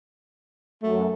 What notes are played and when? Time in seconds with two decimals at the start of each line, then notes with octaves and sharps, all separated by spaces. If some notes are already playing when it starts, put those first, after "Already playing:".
0.82 F#2 A3